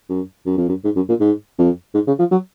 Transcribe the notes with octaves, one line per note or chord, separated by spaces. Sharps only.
F#2
F#2
F2
F#2
G#2
F#2
A#2
G#2
F2
G#2
C#3
F3
F#3